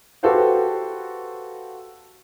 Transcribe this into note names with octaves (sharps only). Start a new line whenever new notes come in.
F#4 G4 A4 B4 C5 F5